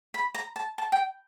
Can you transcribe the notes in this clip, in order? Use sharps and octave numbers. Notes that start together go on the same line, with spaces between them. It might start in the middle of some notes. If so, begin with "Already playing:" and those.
B5
A#5
A5
A5
G5